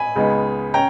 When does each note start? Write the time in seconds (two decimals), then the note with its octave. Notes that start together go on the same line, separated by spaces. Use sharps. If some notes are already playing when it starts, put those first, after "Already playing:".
Already playing: G#5 B5
0.16 C#2 C#3 G#3 B3 D#4
0.74 C#4 G5 A#5